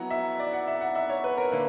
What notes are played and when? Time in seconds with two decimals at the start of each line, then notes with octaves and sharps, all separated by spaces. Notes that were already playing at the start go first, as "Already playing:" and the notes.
Already playing: F#3 B3 E4 F#5 A#5
0.10 E5
0.39 D5
0.53 F#5
0.67 E5
0.81 F#5
0.95 E5
1.10 C#5
1.24 B4
1.38 A#4
1.52 D3 A#3 B4